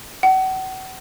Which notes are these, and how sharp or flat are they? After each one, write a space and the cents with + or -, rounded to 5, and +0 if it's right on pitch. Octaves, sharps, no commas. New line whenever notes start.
F#5 +35